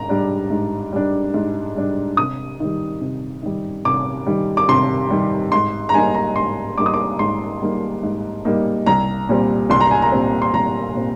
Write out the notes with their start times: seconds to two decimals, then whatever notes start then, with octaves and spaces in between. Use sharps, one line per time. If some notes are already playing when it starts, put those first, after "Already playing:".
Already playing: G#2 A#5
0.09 G3 D4
0.50 G#2
0.92 G3 D4
1.34 G#2
1.76 G3 D4
2.17 C3 D#6
2.60 D#3 G3
3.01 C3
3.43 D#3 G3
3.85 C3 D6
4.26 D#3 G3
4.57 D6
4.69 C3 C6
5.10 D#3 G3
5.52 G#2 C6
5.89 A#5
5.94 G3 A#3 D#4 G#5
6.14 A#5
6.36 G#2 C6
6.78 G3 A#3 D#4 D6
6.86 D#6
6.94 D6
7.19 G#2 C6
7.61 G3 A#3 D#4
8.03 G#2
8.45 G3 A#3 D#4
8.86 C2 A#5
9.29 A#2 G3 C4
9.70 C2 C6
9.81 A#5
9.91 G#5
10.02 A#5
10.12 A#2 G3 C4
10.42 C6
10.53 C2 A#5
10.95 A#2 G3 C4